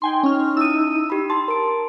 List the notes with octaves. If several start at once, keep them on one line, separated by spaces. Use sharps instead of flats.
D#4 G5 G#5 C6
C#4 F6
E4 D#6 E6 D#7
G4 B5
A5 C6
A#4 D7